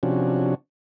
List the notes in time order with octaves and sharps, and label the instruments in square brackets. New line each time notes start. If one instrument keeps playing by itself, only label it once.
[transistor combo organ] C3 F3 C#4 D4 F#4